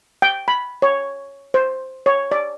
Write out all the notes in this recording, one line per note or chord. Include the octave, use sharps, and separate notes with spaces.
G5
B5
C#5
C5
C#5
D5